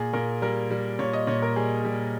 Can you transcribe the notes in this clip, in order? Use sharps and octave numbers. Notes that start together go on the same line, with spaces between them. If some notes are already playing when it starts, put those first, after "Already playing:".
Already playing: A#2 G#4
A#2 A#4
G3 A#4
G3
A#2 C#5
D#5
A#2 C#5
A#4
G3 G#4
G3